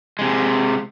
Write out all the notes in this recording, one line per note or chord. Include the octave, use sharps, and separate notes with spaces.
C3 G#3